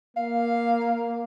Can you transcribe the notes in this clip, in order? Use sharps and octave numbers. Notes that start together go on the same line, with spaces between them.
A#3 F5